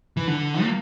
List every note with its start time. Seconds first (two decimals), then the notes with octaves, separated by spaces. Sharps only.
0.17 E3
0.27 D3
0.63 A#3